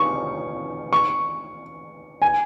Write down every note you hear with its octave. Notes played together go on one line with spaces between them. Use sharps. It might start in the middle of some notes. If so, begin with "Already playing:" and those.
Already playing: C#6
C#6
G#5